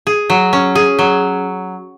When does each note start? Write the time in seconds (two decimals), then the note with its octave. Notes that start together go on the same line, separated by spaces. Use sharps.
0.07 G#4
0.30 F#3
0.53 C#4
0.75 G#4
0.99 F#3